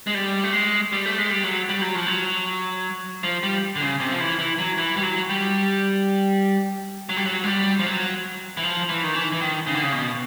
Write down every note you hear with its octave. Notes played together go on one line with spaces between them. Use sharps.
G#3
G3
A3
G#3
G3
A3
G#3
G3
F#3
G3
F#3
F3
F#3
F3
G3
D3
C#3
C3
F3
E3
E3
F#3
E3
G3
F#3
G3
F#3
G3
F#3
G#3
G3
F3
F#3
E3
F3
E3
D#3
E3
E3
D#3
C#3
D3
C#3
B2